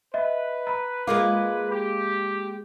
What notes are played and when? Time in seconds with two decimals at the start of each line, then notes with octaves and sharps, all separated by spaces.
0.14 B4 D#5 E5
0.67 A#5 B5
1.07 G#3 A#3 F4 D6
1.70 G4